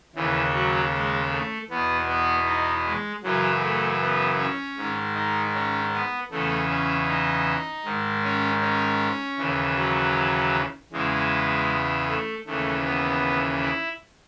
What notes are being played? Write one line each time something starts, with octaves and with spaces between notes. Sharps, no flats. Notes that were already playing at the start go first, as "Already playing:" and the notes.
D#2 C#3 E3
F#3
G#3
A3
E2 B2 B3
B3
D#4
G#3
F#2 C#3 E3 F#3
A3
B3
C#4
G#2 D#3
D#4
C#4
B3
E2 C#3 E3 A3
C#4
D#4
G#2 D#3
C#4
C#4
D#2 C#3 E3
F#3
E2 C#3 E3 G#3
A3
D#2 C#3 E3 A3
B3
E4